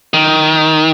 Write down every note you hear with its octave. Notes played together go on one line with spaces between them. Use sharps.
D#3